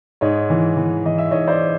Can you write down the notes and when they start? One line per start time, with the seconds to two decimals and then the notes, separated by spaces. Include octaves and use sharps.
0.21 G#2 C#5 D#5
0.50 E3
0.77 E3
1.06 E3 D#5
1.18 E5
1.31 G#2 C#5 D#5
1.47 C5 D5